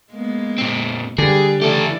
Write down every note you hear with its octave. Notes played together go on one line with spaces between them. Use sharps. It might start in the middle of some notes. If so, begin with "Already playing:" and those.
G#3 A#3 B3
A#2 C4
D3 G3 G4 G#4 B4
C#3 E3 A3 G4 A4 D5